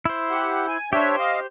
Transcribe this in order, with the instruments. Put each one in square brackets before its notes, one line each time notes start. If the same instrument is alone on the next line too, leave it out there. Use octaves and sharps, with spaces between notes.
[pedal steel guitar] E4 C5
[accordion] G4 F#5
G#5
[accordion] D4 C#5 E5 [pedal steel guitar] G4 C5
[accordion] D#5 F5